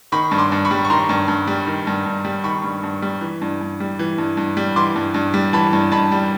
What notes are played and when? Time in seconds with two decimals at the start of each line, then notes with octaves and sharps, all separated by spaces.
0.12 D#3 B5 C#6
0.31 G2
0.38 C6 D6
0.52 G2
0.65 B5 C#6
0.71 G3
0.85 C#6
0.90 D#3 A#5 C6
1.09 G2
1.28 G2
1.47 G3
1.67 D#3
1.87 G2
2.06 G2
2.25 G3
2.44 D#3 B5 C#6
2.64 G2
2.83 G2
3.02 G3
3.21 E3
3.42 G2
3.61 G2
3.80 G3
3.99 E3
4.18 G2
4.37 G2
4.57 G3
4.76 E3 C6 D6
4.96 G2
5.14 G2
5.34 G3
5.53 E3 A5 B5
5.73 G2
5.92 G2 A5 B5
6.12 G3